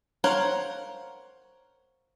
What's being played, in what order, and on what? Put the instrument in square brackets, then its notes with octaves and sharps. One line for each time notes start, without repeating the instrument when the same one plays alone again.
[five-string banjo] A#4 C5 C#5 F5 F#5